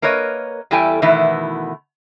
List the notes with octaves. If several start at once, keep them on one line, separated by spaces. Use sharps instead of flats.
A#3 A#4 B4 C#5 D#5
E2 G3 E4 A4 G5 G#5
B2 D#3 E3 A3 B3 E4